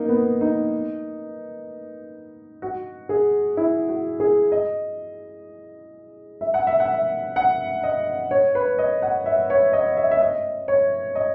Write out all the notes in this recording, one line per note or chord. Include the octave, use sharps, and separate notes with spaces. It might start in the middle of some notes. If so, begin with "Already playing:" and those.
Already playing: A#3 D#4
B3
D#4
F#4
G#4
E4
F#4
G#4
D#5
E5
F#5
E5
F#5
E5
F#5
D#5
C#5
B4
D#5
F#5
E5
C#5
D#5
E5
E5
D#5
C#5
D#5